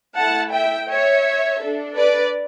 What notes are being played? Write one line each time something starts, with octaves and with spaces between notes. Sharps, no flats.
A3 E4 A4 F#5 A5
E5 G5
C#5 E5
D4 A4
B4 D5